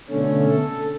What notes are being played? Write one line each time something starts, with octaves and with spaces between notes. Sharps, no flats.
B2 D3 A3 C#4
A4